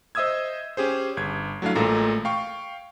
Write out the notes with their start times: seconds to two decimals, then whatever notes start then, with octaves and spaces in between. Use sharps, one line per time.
0.15 C5 D#5 E5 D#6 E6 G#6
0.77 C#4 G4 G#4 C5
1.17 G1 G#6
1.62 F#3 A3 D4 E4 F5
1.75 A1 A#2 G#3 A3 A#5
2.25 F5 G5 C#6